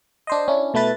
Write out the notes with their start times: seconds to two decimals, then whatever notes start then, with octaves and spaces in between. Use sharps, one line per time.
0.27 D4 C5 D#5
0.48 C#4 D4 E4
0.74 B2 A3 E4 B4 A6